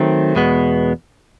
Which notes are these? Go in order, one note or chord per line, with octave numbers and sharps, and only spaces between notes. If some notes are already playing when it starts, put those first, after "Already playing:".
Already playing: D#3 F#3 A3 C4
E2 B2 G#3 B3